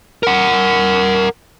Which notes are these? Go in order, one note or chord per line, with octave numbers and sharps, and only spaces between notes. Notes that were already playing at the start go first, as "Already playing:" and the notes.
A#4 F#5